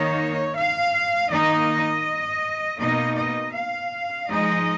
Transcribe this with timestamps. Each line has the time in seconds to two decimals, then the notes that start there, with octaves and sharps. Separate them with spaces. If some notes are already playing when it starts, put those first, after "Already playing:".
Already playing: D#3 A#3 D#4 C#5
0.56 F5
1.30 D#3 A#3 D#4 D#5
2.79 B2 A#3 D#4 D#5
3.16 D#5
3.54 F5
4.27 F3 G#3 D#4 D#5